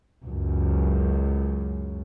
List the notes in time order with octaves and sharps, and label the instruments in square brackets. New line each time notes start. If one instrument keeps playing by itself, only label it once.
[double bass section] C#2 F#2